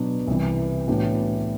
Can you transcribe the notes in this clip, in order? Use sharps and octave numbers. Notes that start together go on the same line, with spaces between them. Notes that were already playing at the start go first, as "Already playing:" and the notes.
Already playing: B2 F#3 B3 D4 F#4
C2 C3 E3
A2 E3 B3 D4 F#4